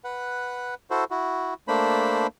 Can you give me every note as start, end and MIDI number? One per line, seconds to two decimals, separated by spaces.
0.04 0.75 71
0.04 0.75 78
0.90 1.04 64
0.90 1.04 66
0.90 1.04 69
0.90 1.04 72
1.11 1.54 64
1.11 1.54 66
1.68 2.27 57
1.68 2.27 58
1.68 2.27 62
1.68 2.27 72
1.68 2.27 83